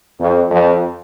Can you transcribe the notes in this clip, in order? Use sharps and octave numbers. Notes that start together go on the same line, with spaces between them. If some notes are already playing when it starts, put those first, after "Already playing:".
F2
F2